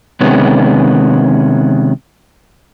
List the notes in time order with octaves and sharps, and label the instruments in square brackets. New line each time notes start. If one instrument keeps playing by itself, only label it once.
[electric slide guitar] C3 D#3 G#3 B3 C#4